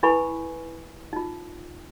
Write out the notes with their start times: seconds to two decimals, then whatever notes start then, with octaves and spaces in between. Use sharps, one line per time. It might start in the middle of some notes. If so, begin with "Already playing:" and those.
0.03 E4 A4 B4 G#5 B5 C#6
1.13 D#4 F4